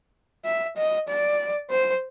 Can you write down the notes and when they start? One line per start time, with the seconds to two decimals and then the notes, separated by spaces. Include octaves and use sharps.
0.45 E5
0.77 D#5
1.08 D5
1.70 C5